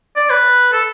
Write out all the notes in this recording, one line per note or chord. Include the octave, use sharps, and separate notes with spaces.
D5
B4
A4